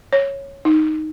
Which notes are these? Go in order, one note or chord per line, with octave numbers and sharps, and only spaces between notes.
C#5
D#4